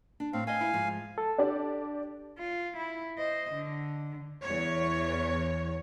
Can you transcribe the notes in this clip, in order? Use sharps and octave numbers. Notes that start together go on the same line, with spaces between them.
D4
A2 C4 F5
B4 D#5 F5 G#5
E4
G#2 F3
A4
D4 G4 D5
F4
E4
C5 D#5
D3
E2 C#5